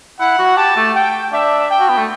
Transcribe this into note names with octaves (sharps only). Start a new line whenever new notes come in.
E4 F#5
F#4
G4 A5
A3
G5
D4 E5
G5
F#4
B3
A3